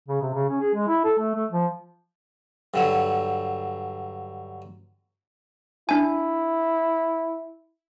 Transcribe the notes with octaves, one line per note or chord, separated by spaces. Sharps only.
C#3
C3
C#3
C#4
G#4
G#3
E4
A4
A3
A3
F3
G2 D3 F#3
D4 E4 G#5